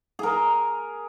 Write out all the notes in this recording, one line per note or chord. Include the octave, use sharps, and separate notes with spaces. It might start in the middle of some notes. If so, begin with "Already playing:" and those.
G#4 A#4